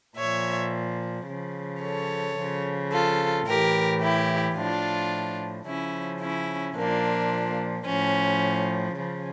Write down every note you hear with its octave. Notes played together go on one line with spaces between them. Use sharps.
A#2 F3 C#5 E5
C#3 F3
A4 C#5
C#3 F3
F4 A4
A2 E3 G4 A#4
E4 G4
A2 F3 D4 F4
C#3 F3 C#4 E4
C#4 E4
A#2 F3 A#3 D4
A2 F3 C#4
C#3 F3